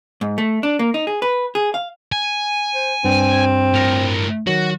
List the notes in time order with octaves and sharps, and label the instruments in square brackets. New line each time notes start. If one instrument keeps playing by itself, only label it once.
[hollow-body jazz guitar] G#2
A3
D4
A#3
D#4
G#4
B4
G#4
F5
[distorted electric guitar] G#5
[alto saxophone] C5
[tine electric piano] G2 [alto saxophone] C4
[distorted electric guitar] A2 A#4
[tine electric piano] D#3 F#3 [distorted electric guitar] F#4